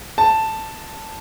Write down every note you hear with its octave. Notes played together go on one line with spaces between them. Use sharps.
A5